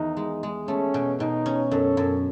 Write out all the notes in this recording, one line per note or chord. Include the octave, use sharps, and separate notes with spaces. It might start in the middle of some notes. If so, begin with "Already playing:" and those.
Already playing: E2 D#3 D#4
G#3
G#3
A3 C#4
B2
B2 D#4
C#4
F#2 A4
F#2